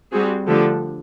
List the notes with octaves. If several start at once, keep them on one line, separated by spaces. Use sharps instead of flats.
G3 C4 F#4 G#4
D3 F3 A3 D4 G4 A4